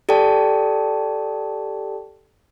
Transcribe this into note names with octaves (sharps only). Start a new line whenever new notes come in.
G4 A4 D5 G5 A5